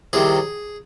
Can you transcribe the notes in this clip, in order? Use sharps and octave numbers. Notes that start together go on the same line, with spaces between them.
C2 C3 D#3 G#4